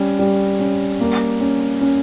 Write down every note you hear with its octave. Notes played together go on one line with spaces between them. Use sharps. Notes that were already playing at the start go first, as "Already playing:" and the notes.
Already playing: G3 C#4
G3
C#4
A#3
C#4
C#4